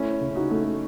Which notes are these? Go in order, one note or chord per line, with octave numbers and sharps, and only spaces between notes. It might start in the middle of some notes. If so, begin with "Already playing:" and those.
Already playing: A3 C#4 E4
C#3
D#4 F#4
A3